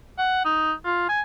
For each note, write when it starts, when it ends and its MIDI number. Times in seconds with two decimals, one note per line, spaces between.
0.18 0.44 78
0.45 0.72 63
0.85 1.06 65
1.09 1.21 80